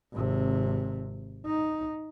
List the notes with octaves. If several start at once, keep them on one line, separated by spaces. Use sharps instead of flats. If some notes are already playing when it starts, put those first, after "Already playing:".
G#1 C3
D#4